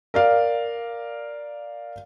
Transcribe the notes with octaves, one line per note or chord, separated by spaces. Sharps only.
A#4 D5 F5